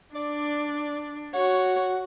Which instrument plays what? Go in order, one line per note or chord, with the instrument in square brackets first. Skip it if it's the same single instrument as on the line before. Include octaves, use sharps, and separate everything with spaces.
[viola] D4 [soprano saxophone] D5
[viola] F#4 [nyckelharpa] C#5 [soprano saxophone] F#5